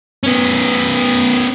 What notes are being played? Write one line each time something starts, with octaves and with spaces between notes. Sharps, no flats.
B3 C#4